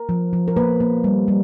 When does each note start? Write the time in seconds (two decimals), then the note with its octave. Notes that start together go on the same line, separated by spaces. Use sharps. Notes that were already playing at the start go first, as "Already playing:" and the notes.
Already playing: A#4
0.09 F3
0.33 F3
0.48 A#4
0.57 A#3 B4
0.80 A#3
1.04 G3
1.28 G3